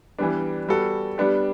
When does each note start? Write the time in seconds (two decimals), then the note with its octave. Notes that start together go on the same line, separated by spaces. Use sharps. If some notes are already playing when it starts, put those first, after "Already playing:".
0.18 E3 G3 B3 D4
0.68 G3 B3 F#4 A4
1.18 G3 B3 D4 G4